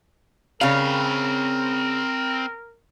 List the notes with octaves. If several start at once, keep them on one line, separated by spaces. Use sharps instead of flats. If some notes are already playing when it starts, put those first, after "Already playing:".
C#3 C4 A#4 F5 B5